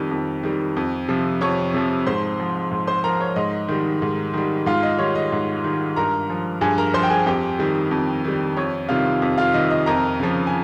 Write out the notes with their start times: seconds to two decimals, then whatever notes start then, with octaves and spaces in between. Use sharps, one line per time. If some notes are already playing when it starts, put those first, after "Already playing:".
Already playing: F2 D#3 G3
0.11 F2
0.43 D#3 G3
0.77 F2
1.08 C3 F3
1.41 F2 C#5 C#6
1.74 C3 F3
2.06 G#2 C5 C6
2.40 F3
2.71 G#2
2.87 C5 C6
3.04 F3 A#4 A#5
3.20 C#5
3.36 G#2 D#5
3.68 D#3 G3
4.02 G#2
4.34 D#3 G3
4.66 G#2 F4 F5
4.83 D#5
4.99 D#3 G3 C#5
5.15 D#5
5.32 G#2
5.64 D#3 G3
5.96 G2 A#4 A#5
6.30 F3
6.61 G2 G#4 G#5
6.78 A#4 A#5
6.94 F3 C5 C6
7.03 G5
7.10 G#4 G#5
7.26 F2 G4 G5
7.59 D#3 G3
7.91 F2
8.25 D#3 G3
8.57 F2 C#5
8.89 C3 D#3 G3 F4 F5
9.22 F2
9.38 F4 F5
9.54 C3 D#3 G3 D#5
9.70 D#5
9.86 F2 A#4 A#5
10.20 C#3 F3
10.47 G#5